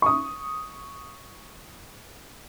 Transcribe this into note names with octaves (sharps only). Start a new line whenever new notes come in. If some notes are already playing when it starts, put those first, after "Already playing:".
C#6 D#6